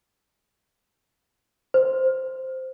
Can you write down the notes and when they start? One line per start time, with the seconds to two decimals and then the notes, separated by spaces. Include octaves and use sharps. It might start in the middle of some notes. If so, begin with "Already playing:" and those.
1.74 C5